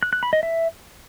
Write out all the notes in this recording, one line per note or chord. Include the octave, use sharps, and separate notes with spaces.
F#6
F#6
B5
D#5
E5